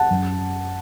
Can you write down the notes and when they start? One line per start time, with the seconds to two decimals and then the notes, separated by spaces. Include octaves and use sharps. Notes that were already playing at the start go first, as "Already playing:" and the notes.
Already playing: F#5 A5
0.10 F#2